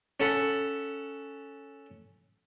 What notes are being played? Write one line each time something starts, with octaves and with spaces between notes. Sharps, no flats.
C#4 A4 F#5 B5